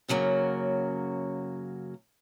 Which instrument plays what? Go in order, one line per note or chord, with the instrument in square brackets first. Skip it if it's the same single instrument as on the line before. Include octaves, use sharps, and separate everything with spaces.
[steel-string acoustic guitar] F#2 C#3 F#3 A3 A#3